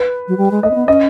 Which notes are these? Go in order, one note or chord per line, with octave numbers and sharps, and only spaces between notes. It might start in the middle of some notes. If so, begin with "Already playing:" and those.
Already playing: B4
F#3
G3
G#3
A3 D#5
C4
B3
C#4 D#5